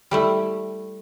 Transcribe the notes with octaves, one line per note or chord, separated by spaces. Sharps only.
G3 A3 E4